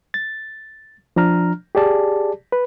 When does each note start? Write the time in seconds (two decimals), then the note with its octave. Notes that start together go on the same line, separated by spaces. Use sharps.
0.14 A6
1.16 F3 D4 A#5 F6
1.75 G4 G#4 D5 A5
2.52 B4